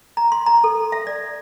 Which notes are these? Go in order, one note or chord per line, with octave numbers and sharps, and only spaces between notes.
A#5
C6
A#5
A4
E5
D5